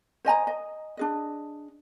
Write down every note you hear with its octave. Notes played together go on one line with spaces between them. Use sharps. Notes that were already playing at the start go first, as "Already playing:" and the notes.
C5 D#5 G#5 A#5
D#5
D4 G#4 D#5